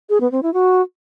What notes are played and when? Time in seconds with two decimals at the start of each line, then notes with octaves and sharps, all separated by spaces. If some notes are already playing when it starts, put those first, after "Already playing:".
0.10 G#4
0.21 B3
0.32 C4
0.43 E4
0.54 F#4